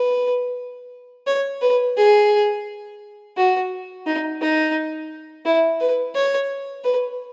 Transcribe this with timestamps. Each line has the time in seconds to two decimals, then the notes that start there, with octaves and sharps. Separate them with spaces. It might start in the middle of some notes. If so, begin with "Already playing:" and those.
Already playing: B4
1.27 C#5
1.62 B4
1.97 G#4
3.37 F#4
4.06 D#4
4.41 D#4
5.45 E4
5.80 B4
6.15 C#5
6.84 B4